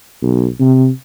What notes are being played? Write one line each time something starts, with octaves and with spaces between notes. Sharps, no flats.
B1
C3